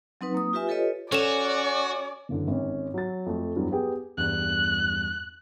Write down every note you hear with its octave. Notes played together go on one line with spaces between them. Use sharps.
F#3 C4 D#4 B4
A#3 D#6
F4 G4 B4 E5 G#5
F4 G4 A4 B4 C#5 D#5
C#4 F#4 A4 D5 E7
F#1 F#2 D3 E3
G#1 C#4
F#3 A6
F2 A3
E2 G2 F#3
B3 G4 G#4 G5
E2 G2 G3 F#6